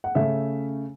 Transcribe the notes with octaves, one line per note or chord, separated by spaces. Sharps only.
F#5
C#3 A3 C#4 E5